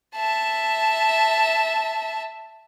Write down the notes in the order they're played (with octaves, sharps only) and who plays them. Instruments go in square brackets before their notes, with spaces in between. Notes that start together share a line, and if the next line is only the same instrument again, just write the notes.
[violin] E5 A5